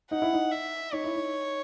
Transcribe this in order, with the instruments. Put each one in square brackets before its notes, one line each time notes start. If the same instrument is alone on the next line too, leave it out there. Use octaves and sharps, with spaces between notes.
[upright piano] D#4 [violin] F#5
[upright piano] E4
D#4
[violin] E5
[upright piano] D#4 [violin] C#5
[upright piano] E4
D#4